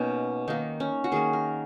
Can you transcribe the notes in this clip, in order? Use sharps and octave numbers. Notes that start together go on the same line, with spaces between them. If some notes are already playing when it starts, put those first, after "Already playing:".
Already playing: B2 A#3 C#4 D#4
D#3 A#3 D#4
C#4
F#4
D#3 A#3 G#4
A#4